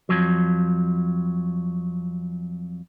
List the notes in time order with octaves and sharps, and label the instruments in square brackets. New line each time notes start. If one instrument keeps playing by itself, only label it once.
[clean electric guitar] F2 A2 F3 F#3